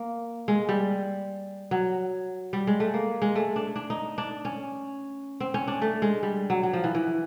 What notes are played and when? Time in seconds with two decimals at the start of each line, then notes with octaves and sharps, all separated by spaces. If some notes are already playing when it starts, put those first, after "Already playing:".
Already playing: A#3
0.48 G#3
0.69 G3
1.71 F#3
2.53 G3
2.67 G#3
2.80 A3
2.94 A#3
3.22 G#3
3.35 A3
3.56 D4
3.76 D4
3.90 D#4
4.18 D4
4.45 C#4
5.40 C4
5.54 C#4
5.68 D4
5.82 A3
6.02 G#3
6.23 G3
6.50 F#3
6.63 F#3
6.73 F3
6.84 E3
6.95 E3